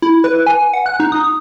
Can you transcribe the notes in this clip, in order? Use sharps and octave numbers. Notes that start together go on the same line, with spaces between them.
E4
B4
G#5
F#5
F#6
D#4
D#6